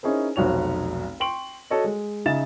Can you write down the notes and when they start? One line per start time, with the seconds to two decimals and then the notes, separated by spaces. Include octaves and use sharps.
0.03 C#4 D#4 E4 G#4 A#4 C5
0.36 F1 B1 F#4 C#5 F7
1.20 G5 C6 C#6 D7 F#7
1.70 F#4 A4 C#5 D#5
1.84 G#3
2.26 C#3 D#4 E5 A6 E7